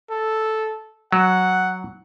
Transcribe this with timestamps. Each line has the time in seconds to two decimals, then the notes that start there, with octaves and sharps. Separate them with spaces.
0.10 A4
1.12 F#3 F#5